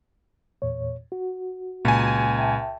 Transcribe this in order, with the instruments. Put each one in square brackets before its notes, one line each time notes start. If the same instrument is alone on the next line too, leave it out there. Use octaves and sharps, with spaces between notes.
[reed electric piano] E2 A#2 C#5
F#4
[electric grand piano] C#2 G#5 [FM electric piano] A#2 A#5
[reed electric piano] E5 G5 A5